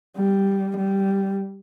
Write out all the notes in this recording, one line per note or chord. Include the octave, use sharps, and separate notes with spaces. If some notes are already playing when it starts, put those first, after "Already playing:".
G3
G3